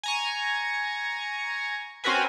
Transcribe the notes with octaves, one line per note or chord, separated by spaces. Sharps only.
G#5 A#5 C#6
C4 C#4 F#4 A#4 B4 G#5